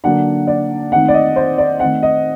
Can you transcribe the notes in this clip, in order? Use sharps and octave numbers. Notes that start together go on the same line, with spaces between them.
D3 F#3 A#3 D4 F#5
D5
D#3 A3 C4 D#4 F#5
D5
D#5
C5
D5
D#3 A3 C4 F#5
D#5